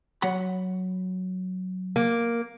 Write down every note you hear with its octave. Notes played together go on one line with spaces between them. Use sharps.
F#3 F#5 B5
A#3